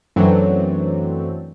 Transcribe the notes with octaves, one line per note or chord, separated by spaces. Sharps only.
F#2 E3 F#3 A3 C4 D4